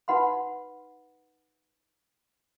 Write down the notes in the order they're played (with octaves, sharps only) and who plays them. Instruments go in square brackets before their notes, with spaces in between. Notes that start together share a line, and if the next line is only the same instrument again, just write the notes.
[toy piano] D#4 B4 F#5 B5 C6